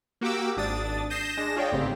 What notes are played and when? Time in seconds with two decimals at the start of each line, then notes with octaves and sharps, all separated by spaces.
0.21 A#3 F#4 G4 D6 E6
0.57 G#1 D4 D#6 A6
1.10 D#6 G6 A#6 C7 E7
1.37 G#3 D4 A#6 E7
1.56 F4 G#4 C#5 D5 G5
1.72 G1 D2 G#2 C#3 C4 G4